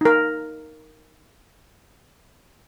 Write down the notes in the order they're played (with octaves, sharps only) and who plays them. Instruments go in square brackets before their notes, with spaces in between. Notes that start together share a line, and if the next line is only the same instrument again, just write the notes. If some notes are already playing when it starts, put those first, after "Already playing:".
[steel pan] D#4 A#4